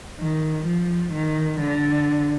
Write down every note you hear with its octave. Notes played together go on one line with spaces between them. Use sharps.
D#3
F3
D#3
D3